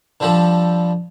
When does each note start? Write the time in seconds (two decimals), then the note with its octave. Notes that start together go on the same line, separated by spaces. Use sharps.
0.20 D3 F3 G3 A4